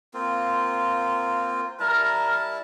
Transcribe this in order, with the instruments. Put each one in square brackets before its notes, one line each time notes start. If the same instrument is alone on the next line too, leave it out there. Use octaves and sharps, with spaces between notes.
[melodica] A#3 C4 F4
[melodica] G3 E4 A5 [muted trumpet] A#4